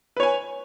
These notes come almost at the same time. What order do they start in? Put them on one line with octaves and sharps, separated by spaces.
B4 C#5 G#5